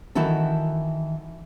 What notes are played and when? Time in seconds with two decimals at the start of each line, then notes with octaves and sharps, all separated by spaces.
0.15 D#3 E3 E4 F#4 A4